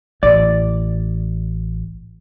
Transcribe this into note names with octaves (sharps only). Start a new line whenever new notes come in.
A1 D5